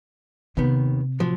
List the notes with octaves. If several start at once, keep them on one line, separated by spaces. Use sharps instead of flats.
D#2 C3 D#3 B3
A2 F3 F#3